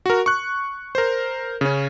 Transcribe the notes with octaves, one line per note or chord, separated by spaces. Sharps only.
F#4 A#4
C#6 F#6
A#4 C5
C#3 C#4